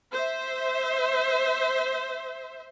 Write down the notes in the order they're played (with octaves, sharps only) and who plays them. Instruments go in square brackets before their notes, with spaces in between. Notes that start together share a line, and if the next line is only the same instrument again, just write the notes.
[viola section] C5 E5